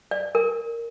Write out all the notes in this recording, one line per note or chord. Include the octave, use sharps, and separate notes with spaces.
D5
A#4